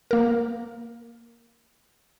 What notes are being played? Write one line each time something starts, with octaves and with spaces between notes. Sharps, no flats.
A#3 A#4